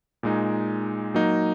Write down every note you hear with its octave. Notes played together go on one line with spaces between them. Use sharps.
A#2 G#3 D#4
F#3 A#3 D#4